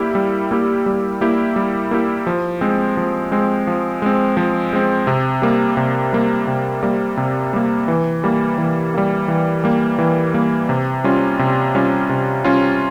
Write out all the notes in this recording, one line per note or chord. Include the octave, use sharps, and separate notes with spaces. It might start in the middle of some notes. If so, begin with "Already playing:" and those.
Already playing: G3 A#3 E4 G4
G3
A#3 E4 G4
G3
A#3 E4 G4
G3
A#3 E4 G4
F3
G#3 C4
F3
G#3 C4
F3
G#3 C4
F3
G#3 C4
C3
G3 A#3
C3
G3 A#3
C3
G3 A#3
C3
G3 A#3
E3
G3 A#3
E3
G3 A#3
E3
G3 A#3
E3
G3 A#3
C3
G3 C#4 F4
C3
G3 C#4 F4
C3
G3 C#4 F4